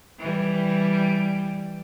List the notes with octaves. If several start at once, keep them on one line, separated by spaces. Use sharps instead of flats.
E3 G3